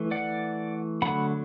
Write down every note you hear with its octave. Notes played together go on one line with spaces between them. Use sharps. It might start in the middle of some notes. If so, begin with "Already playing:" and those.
Already playing: E3 A3
D5 F#5
D3 F#3 A3 F#5 B5